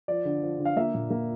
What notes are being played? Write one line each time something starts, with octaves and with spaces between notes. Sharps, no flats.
F3 D5
D3
F3
D3
F5
A#3 E5
A#2
A#3